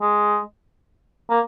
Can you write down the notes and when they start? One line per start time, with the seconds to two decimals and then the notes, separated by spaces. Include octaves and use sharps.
0.01 G#3
1.30 A#3